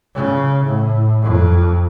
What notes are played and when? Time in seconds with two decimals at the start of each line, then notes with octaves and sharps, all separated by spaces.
0.15 C#3
0.65 A2
1.23 F2